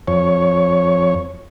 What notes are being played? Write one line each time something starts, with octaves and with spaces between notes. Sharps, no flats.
F2 C#5